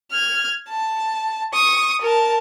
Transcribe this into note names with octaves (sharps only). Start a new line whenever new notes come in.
F6 G#6
A5
C#6 D#6
A#4 A5